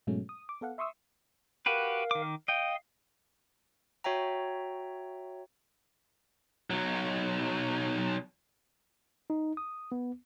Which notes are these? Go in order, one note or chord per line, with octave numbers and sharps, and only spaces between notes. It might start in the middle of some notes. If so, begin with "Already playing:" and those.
G#2 B2 F#3 G#3 A3 C#4
D#6
D6
B3 A4 F5 F#5
E5 C6 C#6 D#6 E6
F#4 G4 A#4 B4 F5
D#3 D6
D#5 F5 G5
F#4 C#5 E5 G5 A#5
B1 F#3
D#4
D#6
B3